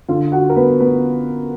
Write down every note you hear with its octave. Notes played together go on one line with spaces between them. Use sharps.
D3 F4 F5
F#4 F#5
A#4
B3 B4
B3 B4